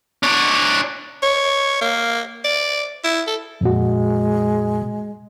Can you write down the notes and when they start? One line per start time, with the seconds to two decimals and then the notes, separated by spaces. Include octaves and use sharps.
0.23 D4 C#5
1.23 C#5
1.81 A#3
2.44 D5
3.04 E4
3.27 A4
3.61 F2 A#2 G#3 F#4